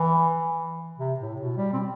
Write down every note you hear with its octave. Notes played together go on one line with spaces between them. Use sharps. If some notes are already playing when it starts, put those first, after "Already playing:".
Already playing: E3
C3
A2
B2
G3
C4